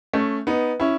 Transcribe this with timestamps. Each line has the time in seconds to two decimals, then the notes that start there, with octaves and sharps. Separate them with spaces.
0.14 A3 C#4
0.47 B3 D#4
0.80 C#4 E4